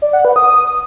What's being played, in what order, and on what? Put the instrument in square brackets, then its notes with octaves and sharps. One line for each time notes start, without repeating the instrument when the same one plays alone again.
[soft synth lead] D5
F#5
B4
D#6